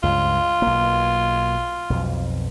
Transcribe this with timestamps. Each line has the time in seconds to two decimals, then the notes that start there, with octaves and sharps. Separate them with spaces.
0.03 C#2 G2 F4
0.62 B1 A#3
1.90 B1 F2